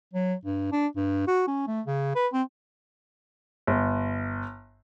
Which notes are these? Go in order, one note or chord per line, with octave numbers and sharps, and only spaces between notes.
F#3
G2
D4
G2
F#4
C#4
A3
C#3
B4
C4
G1